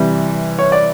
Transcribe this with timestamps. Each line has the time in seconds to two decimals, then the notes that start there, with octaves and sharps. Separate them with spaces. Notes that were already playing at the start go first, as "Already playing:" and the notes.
Already playing: C3 E3 G3
0.59 C#5
0.72 D5